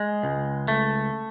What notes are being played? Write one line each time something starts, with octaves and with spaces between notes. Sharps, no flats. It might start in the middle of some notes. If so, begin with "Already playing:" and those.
Already playing: G#3
C#2
A3